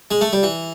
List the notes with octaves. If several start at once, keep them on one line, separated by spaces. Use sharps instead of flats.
G#3
A3
G3
E3